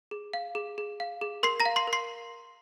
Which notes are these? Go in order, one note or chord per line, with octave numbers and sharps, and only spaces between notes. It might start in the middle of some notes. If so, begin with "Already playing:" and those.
G#4
F5
G#4
G#4
F5
G#4
A#4 C6 C7
A#5 A#6
F5
C6 C7
A#4
C6 C7